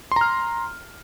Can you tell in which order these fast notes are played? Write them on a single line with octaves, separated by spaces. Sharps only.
C6 A#5 F6